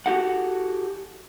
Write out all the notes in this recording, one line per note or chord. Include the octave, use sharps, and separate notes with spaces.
F#4 G4 A4 F#5